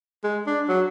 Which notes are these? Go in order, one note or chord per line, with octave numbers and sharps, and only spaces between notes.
G#3
D4
F#3